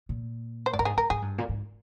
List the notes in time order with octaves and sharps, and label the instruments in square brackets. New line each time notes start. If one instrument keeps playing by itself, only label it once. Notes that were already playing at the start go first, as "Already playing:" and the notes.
[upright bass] A#2
[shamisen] C5
[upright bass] G#2 [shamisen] D5
[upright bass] G2 [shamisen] A#4
[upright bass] G#2 [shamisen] G#4
[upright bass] G#2 [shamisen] A#4
[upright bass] G#2 [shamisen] G#4
[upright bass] G2
A#2
G#2